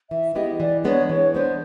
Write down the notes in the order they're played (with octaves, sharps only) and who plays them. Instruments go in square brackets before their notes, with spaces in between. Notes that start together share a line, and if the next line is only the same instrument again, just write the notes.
[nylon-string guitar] E3 [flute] E5
[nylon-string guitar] G#3 B3 E4 G4 [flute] D#5
[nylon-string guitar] E3 [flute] D5
[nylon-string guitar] G#3 B3 D4 [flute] C#5
[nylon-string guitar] E3 [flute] C#5
[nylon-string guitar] G#3 B3 D4 [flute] C5